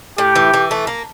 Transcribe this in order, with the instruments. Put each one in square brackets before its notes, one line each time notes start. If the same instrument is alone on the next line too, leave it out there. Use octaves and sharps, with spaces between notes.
[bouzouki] A2 [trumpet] G4
[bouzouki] E3
E3
A3
A#3